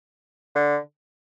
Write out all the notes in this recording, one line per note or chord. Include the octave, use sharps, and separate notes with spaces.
D3